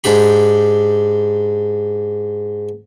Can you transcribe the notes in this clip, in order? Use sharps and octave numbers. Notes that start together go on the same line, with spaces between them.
G#2 D4 G4 B5